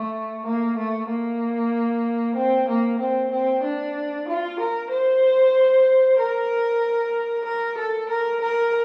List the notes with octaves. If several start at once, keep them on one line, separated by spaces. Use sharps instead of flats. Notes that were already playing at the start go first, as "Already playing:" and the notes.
Already playing: A3
A#3
A3
A#3
C4
A#3
C4
C4
D4
F4
A#4
C5
A#4
A#4
A4
A#4
A#4